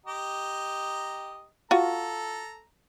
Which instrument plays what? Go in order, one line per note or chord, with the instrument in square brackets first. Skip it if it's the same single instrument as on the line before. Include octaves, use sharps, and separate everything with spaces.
[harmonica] G4 D#5 A#5
[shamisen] F4 F#4 [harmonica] A4 A#5